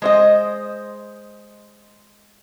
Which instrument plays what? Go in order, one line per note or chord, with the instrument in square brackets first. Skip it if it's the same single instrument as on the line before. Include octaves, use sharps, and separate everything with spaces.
[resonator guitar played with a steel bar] G#3 C5 D#5